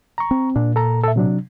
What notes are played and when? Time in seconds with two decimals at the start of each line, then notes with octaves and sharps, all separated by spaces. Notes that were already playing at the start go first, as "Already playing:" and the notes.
0.18 A#5 C#6
0.31 C4
0.56 A#2 D4
0.76 A4 A#5
1.03 A4 E5
1.16 C3 F#3 D4